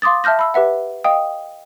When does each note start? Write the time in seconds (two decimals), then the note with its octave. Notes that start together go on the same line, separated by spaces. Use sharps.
0.02 F5 C6 D6 D#6 A6
0.24 E5 A5 F6 G6 A#6
0.39 B5 E6
0.54 G4 B4 E5 F#5
1.04 D#5 F5 G5 D#6